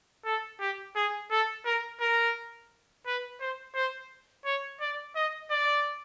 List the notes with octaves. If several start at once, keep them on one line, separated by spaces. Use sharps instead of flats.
A4
G4
G#4
A4
A#4
A#4
B4
C5
C5
C#5
D5
D#5
D5